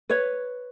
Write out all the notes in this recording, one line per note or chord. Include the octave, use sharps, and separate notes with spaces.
B4 C#5